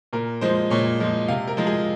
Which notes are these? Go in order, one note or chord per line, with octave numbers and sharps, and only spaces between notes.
A#2 A#4
F3 G#3 C5
A#2 C#5
F3 G#3
C3 F5
A#4
F3 G#3
G#4